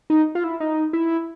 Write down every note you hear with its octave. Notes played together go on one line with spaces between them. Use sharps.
D#4
F4
E4
D#4
E4